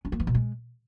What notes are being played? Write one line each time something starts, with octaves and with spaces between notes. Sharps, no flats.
C#4
A#3
E3
B2
G#3